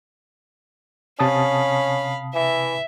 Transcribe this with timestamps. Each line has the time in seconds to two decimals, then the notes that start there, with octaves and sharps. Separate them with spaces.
1.20 C3 C#4 F5 A5 B5 D#6
2.34 E3 E5